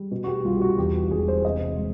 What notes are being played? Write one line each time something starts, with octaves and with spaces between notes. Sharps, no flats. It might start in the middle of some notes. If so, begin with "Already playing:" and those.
Already playing: G3
B2
F#4
G4
C2 F4
G4
F#4
E2 G4
E1 G#4
C5
C3 D#5
G#3